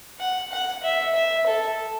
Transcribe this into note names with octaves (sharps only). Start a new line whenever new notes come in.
F#5
F#5
E5
E5
A4